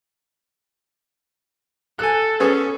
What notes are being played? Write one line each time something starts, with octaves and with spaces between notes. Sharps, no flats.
A4 G#5 F#6
B3 C#4 G#4